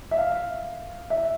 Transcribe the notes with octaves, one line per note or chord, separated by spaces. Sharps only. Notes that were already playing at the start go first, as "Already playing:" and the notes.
E5
F5
E5